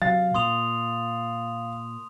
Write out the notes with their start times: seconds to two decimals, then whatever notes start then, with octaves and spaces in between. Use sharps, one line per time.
0.02 C3 F#3 F5 A6
0.34 A#2 C6 D#6 F7